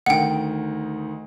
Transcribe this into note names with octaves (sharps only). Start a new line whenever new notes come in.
D2 D#3 F#5 G5